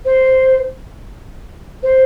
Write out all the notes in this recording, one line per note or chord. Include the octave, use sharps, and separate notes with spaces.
C5
C5